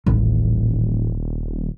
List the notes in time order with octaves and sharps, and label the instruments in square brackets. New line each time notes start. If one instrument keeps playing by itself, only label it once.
[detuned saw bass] D#1 [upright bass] A1